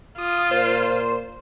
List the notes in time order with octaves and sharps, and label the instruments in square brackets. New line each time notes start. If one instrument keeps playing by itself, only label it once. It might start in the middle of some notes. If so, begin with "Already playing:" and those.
[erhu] F4 [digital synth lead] D#6
[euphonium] A#2 [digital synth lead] C5